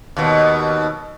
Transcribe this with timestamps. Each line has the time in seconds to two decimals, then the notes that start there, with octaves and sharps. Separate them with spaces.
0.17 D#2 B2